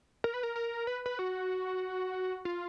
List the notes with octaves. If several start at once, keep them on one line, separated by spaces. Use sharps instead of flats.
A#4
B4
A#4
A#4
B4
B4
F#4
F4